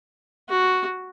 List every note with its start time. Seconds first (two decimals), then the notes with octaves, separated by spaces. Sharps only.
0.49 F#4